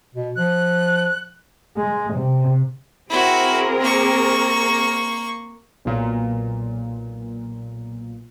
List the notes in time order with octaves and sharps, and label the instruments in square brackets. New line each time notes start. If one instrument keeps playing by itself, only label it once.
[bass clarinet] B2
[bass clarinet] F3 [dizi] F#6
[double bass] G#3
C3
[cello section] C4 G#4 A#4 [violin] E4 F#4
[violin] A#3 C#6
[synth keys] B1 A#2